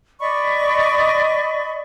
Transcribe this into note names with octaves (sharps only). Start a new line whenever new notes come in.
D5 D#5 B5 C#6